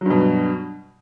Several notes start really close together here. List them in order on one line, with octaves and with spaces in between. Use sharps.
F#3 G2 B2